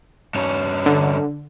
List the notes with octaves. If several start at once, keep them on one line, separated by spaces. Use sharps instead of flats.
G2 C#4
D3